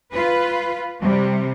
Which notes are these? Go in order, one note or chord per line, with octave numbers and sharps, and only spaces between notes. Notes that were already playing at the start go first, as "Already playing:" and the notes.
F4 B4
C3 G3